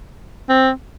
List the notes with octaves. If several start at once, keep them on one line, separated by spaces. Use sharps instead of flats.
C4